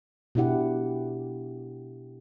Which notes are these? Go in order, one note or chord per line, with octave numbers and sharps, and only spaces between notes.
B2 D4 E4 G4 F#5